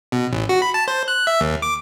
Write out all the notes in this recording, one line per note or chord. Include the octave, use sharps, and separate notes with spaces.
B2
A1
F#4
B5
A5
C5
F#6
E5
D#2
D6